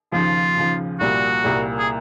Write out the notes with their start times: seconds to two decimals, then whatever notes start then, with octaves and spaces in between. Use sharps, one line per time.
0.12 D#2 C#3 F3 F4
0.57 D#2 C#3 F3
1.00 C2 A#2 G3 F#4
1.44 C2 A#2 G3
1.79 G#4